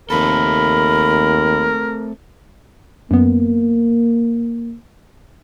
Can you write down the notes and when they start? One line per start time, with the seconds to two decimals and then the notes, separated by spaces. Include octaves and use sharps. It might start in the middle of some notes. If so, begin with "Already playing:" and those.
0.10 D#2 A3 C4 A4 A#4 B5
3.11 F#2 A#3 B3